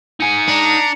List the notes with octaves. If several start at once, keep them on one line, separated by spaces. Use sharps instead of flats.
D#4 G#5 C#7
D4 A#5